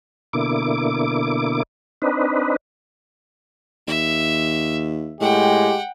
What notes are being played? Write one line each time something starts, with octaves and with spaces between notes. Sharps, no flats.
B2 D3 A#3 E4 D6
C4 D4 D#4 B4
D#2 E5
A2 G#3 G4 F#5 G5